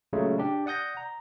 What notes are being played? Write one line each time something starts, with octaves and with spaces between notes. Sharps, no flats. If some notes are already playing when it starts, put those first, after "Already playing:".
A#2 C#3 F#3 G#3 A3
D4 G4
D5 F#5 D#6 G6 A#6
A#5